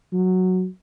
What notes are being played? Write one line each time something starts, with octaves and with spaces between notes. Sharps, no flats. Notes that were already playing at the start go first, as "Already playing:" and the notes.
F#3